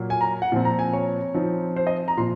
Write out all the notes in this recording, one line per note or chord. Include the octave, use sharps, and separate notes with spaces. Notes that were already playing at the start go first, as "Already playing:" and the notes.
Already playing: A#2 F#3 A#3
G#5
A#5
F#5
A#2 F3 C4
A#5
G#5
C#5
F3 C4 D#4
C5
D#5
A#5
A#2 F3 C6